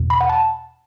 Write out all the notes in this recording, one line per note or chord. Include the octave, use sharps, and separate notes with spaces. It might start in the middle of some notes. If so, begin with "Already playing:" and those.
Already playing: E2 B2
B5
F#5
A5